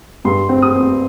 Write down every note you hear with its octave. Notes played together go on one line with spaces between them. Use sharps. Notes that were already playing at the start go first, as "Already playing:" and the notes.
G2 C6
C4
D#6
C4